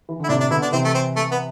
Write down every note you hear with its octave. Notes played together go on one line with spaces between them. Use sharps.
E3
D3 E4
A2 C3 D4
D4
B2 D3 E4
D4
C3 E3 C4
A3
C4
A3
B3